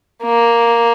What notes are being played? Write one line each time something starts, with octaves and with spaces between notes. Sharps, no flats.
A#3